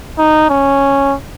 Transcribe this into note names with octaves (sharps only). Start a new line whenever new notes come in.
D#4
C#4